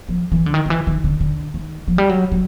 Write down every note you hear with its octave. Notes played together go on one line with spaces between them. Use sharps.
F3
E3
D3
D#3
D#3
E3
D#3
D3
D3
D#3
F3
G3
F#3
F#3